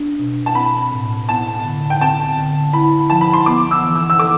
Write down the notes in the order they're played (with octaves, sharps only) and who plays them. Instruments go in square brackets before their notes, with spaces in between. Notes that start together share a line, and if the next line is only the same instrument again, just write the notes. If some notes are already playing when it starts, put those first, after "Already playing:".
Already playing: [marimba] D4
B2
[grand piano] A5
[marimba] C4 [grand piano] B5
[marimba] A2
[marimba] B3 [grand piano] A5
[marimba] D3
[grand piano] G5
[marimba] C4 [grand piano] A5
[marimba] D3
[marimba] E4 [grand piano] B5
[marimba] F3 [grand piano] A5
[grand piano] B5
C6
[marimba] B3 [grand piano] D6
[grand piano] E6
[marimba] E3
[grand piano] E6
E6
[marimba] A4 [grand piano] D6